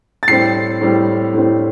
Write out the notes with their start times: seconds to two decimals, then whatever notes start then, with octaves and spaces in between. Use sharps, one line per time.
0.23 A6
0.28 A2 G3 C4 C7
0.81 A2 G3 C4
1.34 A2 G3 C4